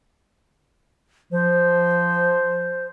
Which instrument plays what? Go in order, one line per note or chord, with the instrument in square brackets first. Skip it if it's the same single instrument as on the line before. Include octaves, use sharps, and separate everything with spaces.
[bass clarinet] F3 [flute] C5